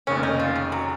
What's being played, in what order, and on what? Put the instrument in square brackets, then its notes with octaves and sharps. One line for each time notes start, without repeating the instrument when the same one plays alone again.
[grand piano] F1 D#2 C#3 [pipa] C#4
[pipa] D#4
F4
G#3
F#3